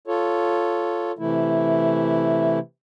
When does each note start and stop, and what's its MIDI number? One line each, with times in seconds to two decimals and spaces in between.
0.07 1.12 65
0.07 1.12 69
0.07 1.12 73
1.19 2.59 48
1.19 2.59 52
1.19 2.59 57
1.19 2.59 64